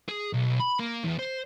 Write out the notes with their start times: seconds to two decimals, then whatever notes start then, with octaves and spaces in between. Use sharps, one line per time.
0.08 G#4
0.33 B1
0.60 B5
0.79 A#3
1.04 E2
1.19 C5